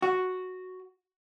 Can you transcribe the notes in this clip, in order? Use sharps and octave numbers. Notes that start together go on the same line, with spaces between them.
F#4